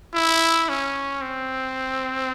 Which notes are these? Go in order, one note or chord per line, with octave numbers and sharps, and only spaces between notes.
E4
C#4
C4